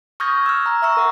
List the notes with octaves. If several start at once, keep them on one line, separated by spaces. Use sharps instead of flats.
C#6 D#6 F6 G6 G#6 A#6
E6 F6
A#5
E5 A#5 C#6 E6
A#4 F#5